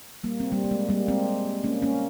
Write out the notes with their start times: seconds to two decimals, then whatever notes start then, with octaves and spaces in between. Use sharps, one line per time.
0.24 G3 A#3
0.40 C4
0.52 G3 A#3
0.64 A#3
0.71 G#3
0.89 G3 A#3
1.08 G#3 C4
1.64 A#3 C#4
1.82 A#3 C#4